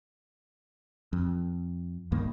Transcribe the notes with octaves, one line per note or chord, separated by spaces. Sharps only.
F2
C#2 G2 D#3 A#3